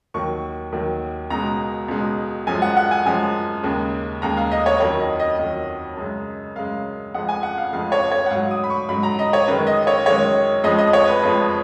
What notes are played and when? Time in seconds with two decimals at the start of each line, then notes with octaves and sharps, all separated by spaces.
0.14 D#2 D#3 F#3 C#6
0.72 D#2 D#3 F#3
1.30 C#2 B2 G#3 A#5
1.88 C#2 B2 G#3
2.47 F#2 F3 G#3 G#5
2.62 F#5
2.77 F#5
2.91 G#5
3.05 F#2 F3 G#3 G#5
3.63 D#2 C#3 G#3
4.22 D#2 C#3 G#3 A#5
4.37 F5
4.51 D#5
4.66 C#5
4.80 F2 D#3 F#3 C#5
5.00 D#5
5.20 D#5
5.39 F2 D#3 F#3
5.97 F#2 C#3 G#3
6.56 F#2 C#3 G#3 F5
7.14 F2 F3 G#3 F#5
7.29 G#5
7.43 F#5
7.58 F5
7.73 F2 F3 G#3 F5
7.92 C#5
8.11 C#5
8.26 F#5
8.30 G#2 F#3 F5
8.51 D#6
8.64 B5
8.70 C#6
8.89 G#2 F#3 B5
9.03 A#5
9.19 D#5
9.33 C#5
9.47 F#2 D#3 G#3 B4
9.67 D#5
9.87 C#5
10.06 F#2 D#3 G#3 C#5
10.64 F2 F3 G#3 D#5
10.78 D#5
10.93 C#5
11.08 B4
11.22 F2 F3 G#3 B4